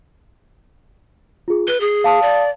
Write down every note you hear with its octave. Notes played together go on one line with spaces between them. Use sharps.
F4 G#4
B4 G7
G#4
F5 A5 D#6
D5